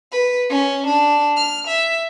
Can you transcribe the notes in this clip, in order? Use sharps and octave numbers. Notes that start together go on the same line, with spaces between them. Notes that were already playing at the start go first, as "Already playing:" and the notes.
B4
C#4
D4
F6
E5